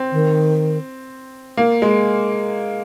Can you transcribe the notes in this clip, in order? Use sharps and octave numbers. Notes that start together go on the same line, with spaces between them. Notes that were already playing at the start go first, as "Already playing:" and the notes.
Already playing: C4
D#3
A#3
G#3